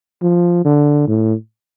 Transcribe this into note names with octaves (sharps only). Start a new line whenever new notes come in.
F3
D3
A2